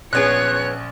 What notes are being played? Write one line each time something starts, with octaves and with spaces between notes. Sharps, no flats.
A#1 F3 B3 C#4 G#4 C#5 F#6 D7